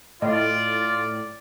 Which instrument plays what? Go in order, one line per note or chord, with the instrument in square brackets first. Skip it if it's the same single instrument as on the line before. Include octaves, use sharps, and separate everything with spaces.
[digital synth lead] A2 [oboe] F4 [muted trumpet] D5 [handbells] D#5